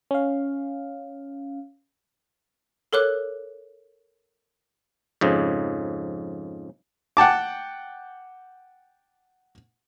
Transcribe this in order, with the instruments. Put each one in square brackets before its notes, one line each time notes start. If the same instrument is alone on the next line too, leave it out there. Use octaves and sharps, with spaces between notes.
[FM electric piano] C#4 F5
[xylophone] A4 A#4 C#5 D6 F#6
[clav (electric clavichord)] F2 G#2 C#3
[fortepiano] F#5 G5 A5 D6